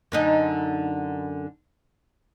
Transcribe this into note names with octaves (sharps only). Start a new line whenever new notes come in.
F#2 D3 D#4